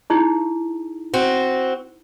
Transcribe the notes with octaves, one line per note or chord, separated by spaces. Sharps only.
D#4 E4 G#4
C4 F#4